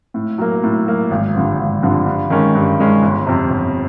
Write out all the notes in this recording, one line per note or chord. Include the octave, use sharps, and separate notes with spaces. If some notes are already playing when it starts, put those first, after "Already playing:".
A2
F#3 A#3
A2
F#3 A#3
G#1
G2 D3 F3
G#1
G2 D3 F3
G2
D#3 G#3 C#4
G2
D#3 G#3 C#4
G1
F2 C3
G1